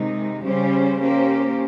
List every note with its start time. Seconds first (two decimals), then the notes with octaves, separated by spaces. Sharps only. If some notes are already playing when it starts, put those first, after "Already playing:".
Already playing: C3 D#3 G#3 D#4
0.43 C#3 G3 C#4 G4 C5
0.98 A#3 C#4 G4 C5